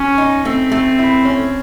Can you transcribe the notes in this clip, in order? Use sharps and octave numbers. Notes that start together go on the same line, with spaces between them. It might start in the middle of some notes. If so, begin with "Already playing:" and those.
Already playing: C#4
D#4
A3 C4
A3
E4
C#4